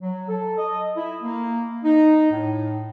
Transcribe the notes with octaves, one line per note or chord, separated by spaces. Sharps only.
F#3
A4
D#5
E4
A#3
D#4
A2